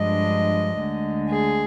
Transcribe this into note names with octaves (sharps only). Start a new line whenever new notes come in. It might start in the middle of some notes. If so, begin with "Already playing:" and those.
Already playing: G2 F3 G#3 D4 D#5
D2 D3 G#3
G#4